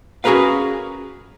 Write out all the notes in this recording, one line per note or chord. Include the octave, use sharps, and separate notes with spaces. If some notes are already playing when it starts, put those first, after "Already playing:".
C#4 F#4 G#4 A#4 B4 F5